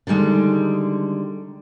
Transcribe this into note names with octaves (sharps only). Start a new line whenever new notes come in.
D3 D#3 G3 G#3